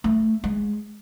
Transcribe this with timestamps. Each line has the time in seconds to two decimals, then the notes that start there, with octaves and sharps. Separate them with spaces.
0.04 A3
0.44 G#3